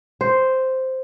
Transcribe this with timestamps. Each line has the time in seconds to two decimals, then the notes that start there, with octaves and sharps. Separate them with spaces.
0.21 C5